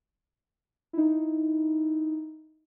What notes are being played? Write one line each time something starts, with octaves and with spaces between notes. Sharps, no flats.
D#4 E4